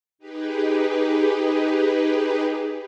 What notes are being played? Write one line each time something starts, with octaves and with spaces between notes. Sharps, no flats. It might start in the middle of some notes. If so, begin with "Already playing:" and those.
D#4 G4 G#4 B4